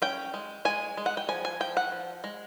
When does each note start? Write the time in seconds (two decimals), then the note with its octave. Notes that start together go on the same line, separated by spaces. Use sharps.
0.02 C#4 G5
0.34 G#3
0.65 G#3 G#5
0.97 G#3
1.06 F#5
1.17 G5
1.29 F3 G#5
1.45 G#5
1.60 F3 G5
1.77 F#5
1.92 F3
2.24 G#3